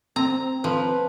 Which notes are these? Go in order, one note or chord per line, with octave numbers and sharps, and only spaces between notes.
C4 A#5
F3 B4